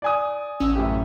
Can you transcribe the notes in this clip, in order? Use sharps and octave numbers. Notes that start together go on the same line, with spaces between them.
D5 G#5 D#6
A1 C#4 E6
F#2 A2 G4